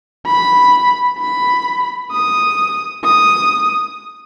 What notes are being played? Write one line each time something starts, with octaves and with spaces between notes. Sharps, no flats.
B5
B5
D#6
D#6